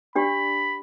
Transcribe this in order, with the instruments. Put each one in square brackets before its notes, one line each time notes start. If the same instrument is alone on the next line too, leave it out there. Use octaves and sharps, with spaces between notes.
[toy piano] D4 G4 D5 [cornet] B5